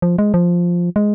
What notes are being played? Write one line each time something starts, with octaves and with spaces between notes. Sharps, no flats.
F3
G#3
F3
G#3